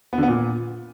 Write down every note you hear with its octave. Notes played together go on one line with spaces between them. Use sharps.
B3
D3
B3
A#2